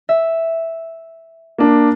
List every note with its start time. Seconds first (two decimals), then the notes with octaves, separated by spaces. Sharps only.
0.09 E5
1.58 A#3 D4